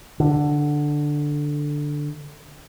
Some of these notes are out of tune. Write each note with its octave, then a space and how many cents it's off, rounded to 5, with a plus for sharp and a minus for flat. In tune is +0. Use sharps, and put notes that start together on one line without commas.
D3 +5